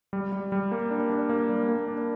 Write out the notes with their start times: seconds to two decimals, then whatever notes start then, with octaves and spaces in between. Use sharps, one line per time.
0.13 G3
0.32 G3
0.52 G3
0.72 A#3
0.91 D4
1.10 D4
1.29 A#3
1.49 G3
1.69 A#3
1.88 D4